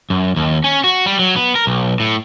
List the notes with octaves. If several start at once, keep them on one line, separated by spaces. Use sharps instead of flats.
F#2
D#2
C#4
F#4
G3
F#3
B3
A#4
B1
A2